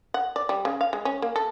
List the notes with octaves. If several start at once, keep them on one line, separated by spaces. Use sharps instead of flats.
F#5
D5
G3
C#3
F5
G#3
C#4
A#3
A4